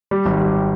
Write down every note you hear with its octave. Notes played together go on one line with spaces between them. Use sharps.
G3
G#1
G3